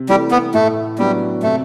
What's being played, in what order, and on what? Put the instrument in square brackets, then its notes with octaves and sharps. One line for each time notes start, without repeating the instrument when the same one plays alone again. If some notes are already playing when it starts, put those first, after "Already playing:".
Already playing: [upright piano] C3
[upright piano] E3 A3 [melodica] G3
[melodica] B3
[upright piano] A2 [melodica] A3
[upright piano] F#3 B3 D4 [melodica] G3
[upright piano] C3 [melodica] A3